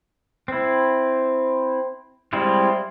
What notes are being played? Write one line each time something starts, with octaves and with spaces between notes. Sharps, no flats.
C4 E4
G3 G#3 C4 E4 F4